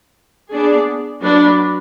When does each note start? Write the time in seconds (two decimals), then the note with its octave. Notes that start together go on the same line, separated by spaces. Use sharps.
0.51 B3 D4 G#4 D5
1.21 F#3 D4 F#4 B4